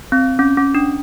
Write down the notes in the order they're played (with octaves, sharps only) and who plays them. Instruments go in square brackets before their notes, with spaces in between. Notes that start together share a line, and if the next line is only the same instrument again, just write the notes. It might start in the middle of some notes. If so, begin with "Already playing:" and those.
[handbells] C4
C#4
C#4
D4